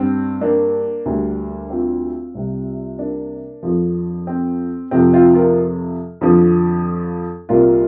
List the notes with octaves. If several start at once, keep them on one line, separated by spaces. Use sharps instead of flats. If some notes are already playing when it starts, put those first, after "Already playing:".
Already playing: G2 G3 C4
A#3 D4
D2 D3 G3
C4 F4
C2 C3 G3
A#3 D4
F2 F3
C4
F2 C3 F3 C4
C4 F4
F4 A#4
F2 D3 F3
C2 A#2 G3 F4 A#4